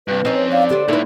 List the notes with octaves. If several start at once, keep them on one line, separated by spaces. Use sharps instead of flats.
G2 C3 B4
F2 C4 C#4 D#4
D5 F5
D3 B3 C4 G4
A#2 D#4 E4 A4 B4